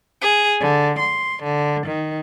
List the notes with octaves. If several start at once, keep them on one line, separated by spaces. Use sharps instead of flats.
G#4
D3
C6
D3
D#3